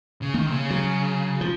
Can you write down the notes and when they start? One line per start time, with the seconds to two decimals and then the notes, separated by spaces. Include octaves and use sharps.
0.22 C#3
0.34 D#3 A#3
0.47 C3
0.52 C#3
0.70 F#3
1.41 F3